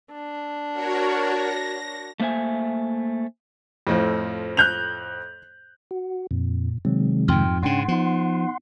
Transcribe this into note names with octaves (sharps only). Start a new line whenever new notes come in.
D4
F#4 A#4 C#5
A#6
A3 A#3 C5 E5 G#5
F2 A2 F3
F#6 G6 F7
F#4
F2 A#2
C3 D#3 F#3 G#3 C4
F2 G#2 G5 C6 F6
G#2 C#3 C#4 D4 F#5 G5 C6
F3 B3 D#4